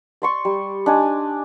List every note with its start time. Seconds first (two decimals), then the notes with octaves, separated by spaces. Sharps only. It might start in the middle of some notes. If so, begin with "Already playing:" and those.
0.22 D5 C6 C#6
0.45 G3
0.86 D4 D#4 G#5